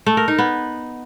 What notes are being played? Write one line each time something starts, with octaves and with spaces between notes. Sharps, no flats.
A3
A#4
D#4
B3